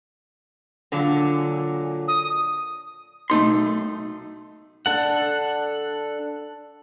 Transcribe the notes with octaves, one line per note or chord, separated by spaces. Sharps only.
A#2 D3 F#3
D#6
B1 A3 D#4 C6
D4 A4 F#5